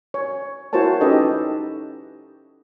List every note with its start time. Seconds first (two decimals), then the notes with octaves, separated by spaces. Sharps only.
0.14 C#5
0.73 E4 F#4 A#4 C5 C#5 A5
1.01 C#4 D#4 G4 A4 B4 D#5